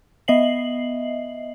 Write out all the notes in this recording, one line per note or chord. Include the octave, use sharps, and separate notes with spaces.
B3 D#5 E5 C7 F#7